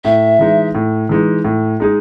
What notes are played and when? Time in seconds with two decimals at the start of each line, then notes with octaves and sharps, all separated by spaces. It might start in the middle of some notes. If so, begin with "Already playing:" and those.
0.04 A2 E5
0.39 E3 G#3 D#4
0.75 A2
1.09 E3 G#3 D#4
1.45 A2
1.80 G#3 D#4 G#4